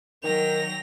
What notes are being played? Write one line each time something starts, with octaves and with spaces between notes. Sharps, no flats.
D#3 F#3 A#4 G5 A#6 F7